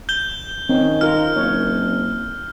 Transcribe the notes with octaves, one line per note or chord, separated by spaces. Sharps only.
G6 G7
D#3 C4 C#4
D#4 F4 A#4 F6
F#1 C#5